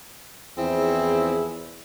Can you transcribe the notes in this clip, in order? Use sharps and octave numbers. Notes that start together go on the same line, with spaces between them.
E2 F3 C4 E4 G#4